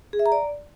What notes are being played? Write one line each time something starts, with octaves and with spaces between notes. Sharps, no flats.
G#4
E5
A#5
D5